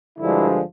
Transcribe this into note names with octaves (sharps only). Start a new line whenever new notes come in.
G2 D3 F3 G#3 E4